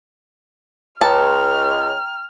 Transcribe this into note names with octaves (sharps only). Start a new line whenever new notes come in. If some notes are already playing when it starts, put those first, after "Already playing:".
C#2 G5 A5 A#5 F6